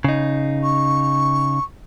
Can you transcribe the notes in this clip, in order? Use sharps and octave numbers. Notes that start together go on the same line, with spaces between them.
C#3 D#4
C#6